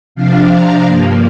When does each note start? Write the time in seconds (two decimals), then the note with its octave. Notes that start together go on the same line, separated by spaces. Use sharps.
0.15 C3 F3 D4 F5
0.51 A#5
0.86 G2 F3 A#3